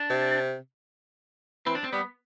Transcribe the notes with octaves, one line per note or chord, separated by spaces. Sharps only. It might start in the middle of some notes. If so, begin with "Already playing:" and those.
Already playing: D4
C3
E3 C4
D4
C4
G3 B3